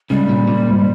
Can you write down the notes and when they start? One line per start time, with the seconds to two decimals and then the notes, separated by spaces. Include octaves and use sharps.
0.10 C#2 C#3 G3
0.29 A#2
0.48 A#2
0.67 G#2